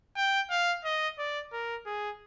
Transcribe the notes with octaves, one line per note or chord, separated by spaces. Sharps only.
G5
F5
D#5
D5
A#4
G#4